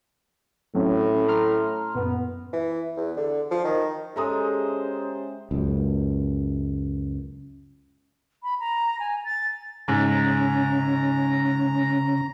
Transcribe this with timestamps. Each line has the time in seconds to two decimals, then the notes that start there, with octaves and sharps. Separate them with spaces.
0.75 A2 F#3 C4 C#4
1.28 A#5 C6 F6
1.95 F#2 A#2 B3
2.53 E3
2.97 E2
3.17 D3
3.51 F3
3.64 D#3
4.16 G#3 C#4 G4 A4 C5 E5 A#5 D#6
5.51 C#2 F#2
8.43 B5
8.60 A#5
8.99 G#5
9.25 A6
9.88 G#2 C#3 C#4 A#5